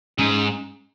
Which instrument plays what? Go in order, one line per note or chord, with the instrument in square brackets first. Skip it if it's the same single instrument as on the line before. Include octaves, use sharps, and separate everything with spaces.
[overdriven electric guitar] G#2 [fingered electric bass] C#4